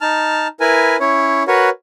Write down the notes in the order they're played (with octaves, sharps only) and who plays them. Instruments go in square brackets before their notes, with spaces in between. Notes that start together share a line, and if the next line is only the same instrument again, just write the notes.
[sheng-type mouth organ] D#4 A5 F6
E4 A#4 B4 G#5
C#4 E4 C#5
F#4 A#4 B4 C#5